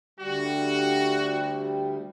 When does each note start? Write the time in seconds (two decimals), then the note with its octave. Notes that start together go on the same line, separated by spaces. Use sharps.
0.20 D2 G3 F#4